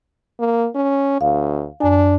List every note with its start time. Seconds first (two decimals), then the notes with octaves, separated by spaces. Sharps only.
0.40 A#3
0.75 C#4
1.21 D2 F5
1.81 F#2 D4 G#5